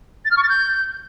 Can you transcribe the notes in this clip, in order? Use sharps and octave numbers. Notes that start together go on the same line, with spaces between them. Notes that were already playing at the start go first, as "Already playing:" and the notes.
A6
F6
C#6
A6
G6